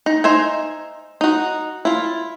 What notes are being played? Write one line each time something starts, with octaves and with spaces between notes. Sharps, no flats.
D#4
D#4 C5 E5 G#5
D#4 F#4
E4 F4